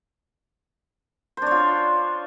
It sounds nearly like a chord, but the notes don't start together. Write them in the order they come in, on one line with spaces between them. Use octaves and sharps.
C5 D4 C#5 F4